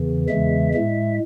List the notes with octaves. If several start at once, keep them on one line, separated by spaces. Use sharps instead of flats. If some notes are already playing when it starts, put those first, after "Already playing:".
Already playing: E2 C#3 E3
E2 C#3 E3 G#3 E5
A2 G#3 E5